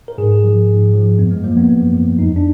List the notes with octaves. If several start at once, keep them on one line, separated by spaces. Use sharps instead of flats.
A#4
G#2 G#4
F3
G#2
F3
F#2 B3
G#3
F3 A#3
B3
F#2
F3
F2 D#4
D4